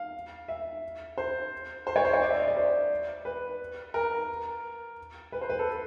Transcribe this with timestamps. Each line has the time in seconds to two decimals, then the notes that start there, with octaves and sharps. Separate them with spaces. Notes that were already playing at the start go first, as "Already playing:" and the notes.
Already playing: F5
0.48 E5
1.18 C5
1.87 C5
1.96 C#5
2.05 C5
2.13 C#5
2.22 D5
2.30 E5
2.39 D#5
2.48 D5
2.56 C5
3.25 B4
3.94 A#4
5.32 B4
5.41 C5
5.50 B4
5.59 A4